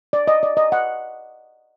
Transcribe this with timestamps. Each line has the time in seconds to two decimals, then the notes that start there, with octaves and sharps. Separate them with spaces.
0.13 D5
0.27 D#5
0.43 D5
0.57 D#5
0.72 F#5